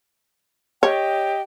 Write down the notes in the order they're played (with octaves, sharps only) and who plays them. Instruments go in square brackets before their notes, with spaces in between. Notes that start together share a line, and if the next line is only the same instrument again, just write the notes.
[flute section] G4 D#5 G5 [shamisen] C#5